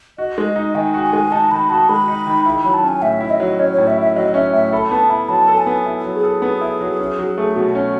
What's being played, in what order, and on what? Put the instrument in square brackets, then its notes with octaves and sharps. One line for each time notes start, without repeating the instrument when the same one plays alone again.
[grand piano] F#4 [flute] D#5
[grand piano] G#3
D#4
[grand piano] D#3 [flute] G#5
[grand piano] F#4
[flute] G#5
[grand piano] G#3
[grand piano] D#4 [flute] A5
[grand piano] D#3 [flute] B5
[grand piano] F#4 [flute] A5
[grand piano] G#3 [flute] B5
[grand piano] D#4
D#3
[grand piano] E4 [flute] B5
[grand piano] F#3 [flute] B5
[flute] A5
[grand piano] C#4 [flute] G#5
[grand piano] A2 [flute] E5
[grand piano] E4
[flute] D#5
[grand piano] F#3
[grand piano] C#4 [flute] C#5
[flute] C#5
[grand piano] A2
[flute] E5
[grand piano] E4 [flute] E5
[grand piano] F#3 [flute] D#5
[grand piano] C#4 [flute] E5
[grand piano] A2 [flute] E5
[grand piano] A4 [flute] B5
[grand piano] B3 [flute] A5
[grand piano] E4 [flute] B5
[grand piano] F#3 [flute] A5
[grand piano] A4
[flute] G#5
[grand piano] B3
E4
F#3
[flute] G#4
[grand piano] A4
B3
E4
F#3
C#4
F#3
A3
[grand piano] B2 [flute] F#4
[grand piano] C#4